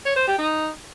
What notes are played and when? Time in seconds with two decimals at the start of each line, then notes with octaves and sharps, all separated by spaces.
0.05 C#5
0.16 C5
0.27 G4
0.38 D#4